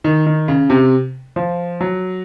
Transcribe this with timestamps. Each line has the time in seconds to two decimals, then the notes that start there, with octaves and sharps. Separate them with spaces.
0.04 D#3
0.26 D#3
0.48 C#3
0.70 C3
1.36 F3
1.81 F#3